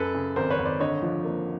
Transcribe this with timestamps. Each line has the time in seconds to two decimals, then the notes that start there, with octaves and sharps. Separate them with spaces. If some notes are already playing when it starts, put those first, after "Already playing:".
Already playing: F#2 A4 B4
0.14 C#3
0.36 G#1 A#4 C5
0.50 B4 C#5
0.59 G#1
0.65 C5 D5
0.80 D3 C#5 D#5
1.02 F3
1.24 A#3